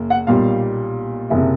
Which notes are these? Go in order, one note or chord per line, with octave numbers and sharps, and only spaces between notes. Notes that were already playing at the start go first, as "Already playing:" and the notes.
Already playing: F#1 A#3
F#5
B1 A#2 G3 F5
F#1 C3 E5